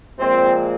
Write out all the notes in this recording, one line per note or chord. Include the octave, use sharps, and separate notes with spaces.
A#2 F3 G#3 C4